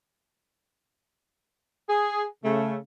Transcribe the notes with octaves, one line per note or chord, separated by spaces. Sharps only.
G#4
C#3 A3